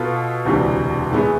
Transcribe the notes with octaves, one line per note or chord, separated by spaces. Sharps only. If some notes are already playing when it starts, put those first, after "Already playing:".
Already playing: B2 B3 F4 A4
E1 D2 C3 E3
A2 E3 G#3 B3 E4